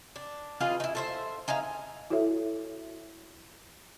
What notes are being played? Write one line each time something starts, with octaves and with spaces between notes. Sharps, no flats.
D4
F4 G#4 B4 D#5
D#4 E4
A4 C5 E5
D#4 G#4 E5 F5
E4 F#4 A4 C#5 E5